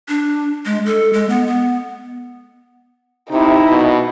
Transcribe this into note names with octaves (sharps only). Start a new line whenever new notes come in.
D4
G#3
A4
G#3
B3
B3
C3 D#4 E4
B2